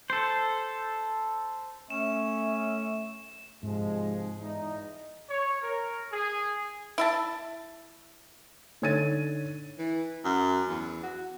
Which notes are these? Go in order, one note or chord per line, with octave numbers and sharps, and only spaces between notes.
A4 C5
A3 C#4 E5 E7
G#2 C3 F3 G#3
E2 D#4
C#5
A#4
G#4
E4 E5 A5
D3 D#4 C#5 G#6 A6 D#7
E3
F#2
E2
F#4